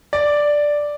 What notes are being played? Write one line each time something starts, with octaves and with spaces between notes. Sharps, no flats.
D5